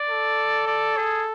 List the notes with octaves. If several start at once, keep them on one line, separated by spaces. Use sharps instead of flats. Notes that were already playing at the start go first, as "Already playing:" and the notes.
Already playing: D5
A4
D5
G#4